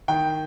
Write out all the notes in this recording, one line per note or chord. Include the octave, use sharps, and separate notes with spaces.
D#3 G5